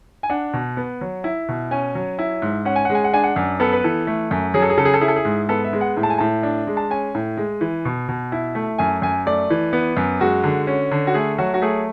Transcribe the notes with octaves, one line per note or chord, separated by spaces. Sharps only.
G#5
D4 F#5
B2
B3
F#3
E4
B2
C#4 G#5
F#3
E4
G#2
C#4 F#5
G#5
G#3 F#5
G#5
F#5
D4 G#5
F#5
F#2
B3 A4
B4
E3 A4
A3
F#2
F#3 G#4
A4
G#4
C#3 A4
G#4
A4
E4 G#4
A4
G#4
G#2
B3 A4
E5
G#3
F#5
A2
A5
G#5
A2 A5
D4
G#3
A5
C#4 G#5
A2
G#3
E3
B2
B2
E4
A3
F#2 G#5
F#2 G#5
A3 D5
E3
B3
F#2
G#3 F#4
D3
C#4
D3
F#4
A3 G#4
F#3 F#4
F#4
A3 G#4